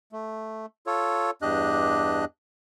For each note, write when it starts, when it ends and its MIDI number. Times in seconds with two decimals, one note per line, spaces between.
0.12 0.66 57
0.87 1.31 65
0.87 1.31 69
0.87 1.31 73
1.42 2.25 40
1.42 2.25 43
1.42 2.25 62
1.42 2.25 67
1.42 2.25 75
1.42 2.25 90